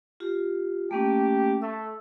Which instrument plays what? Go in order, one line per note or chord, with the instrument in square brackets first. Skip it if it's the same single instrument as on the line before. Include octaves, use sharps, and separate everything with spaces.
[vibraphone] F4 G4
[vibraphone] A3 A#3 C#4 [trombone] G4
[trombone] A3 [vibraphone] E6